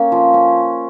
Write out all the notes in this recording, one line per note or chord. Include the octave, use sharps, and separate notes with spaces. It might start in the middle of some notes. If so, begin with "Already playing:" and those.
Already playing: A#3 C#4
F3
C#4